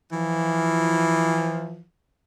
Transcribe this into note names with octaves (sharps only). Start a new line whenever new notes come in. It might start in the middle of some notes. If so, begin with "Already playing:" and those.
E3 F3